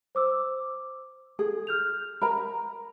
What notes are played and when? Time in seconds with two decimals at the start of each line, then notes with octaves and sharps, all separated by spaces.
0.15 C5 D6 E6
1.39 G#4 A4
1.67 F6 G6 F7
2.22 A#4 A#5 B5